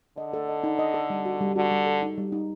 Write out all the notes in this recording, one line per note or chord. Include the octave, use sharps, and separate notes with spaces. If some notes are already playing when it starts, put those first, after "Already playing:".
D3 D#5
A4
D#5
D#4
D#5
A4
G3
F#4
G3
D3 F#4
G3
A4
D#4
G3
D#4